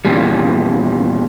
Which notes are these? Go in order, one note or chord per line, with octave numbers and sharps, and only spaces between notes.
E2 A#2 G3